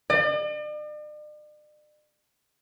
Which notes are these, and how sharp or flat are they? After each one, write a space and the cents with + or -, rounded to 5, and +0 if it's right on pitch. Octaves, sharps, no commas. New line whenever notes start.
D5 +45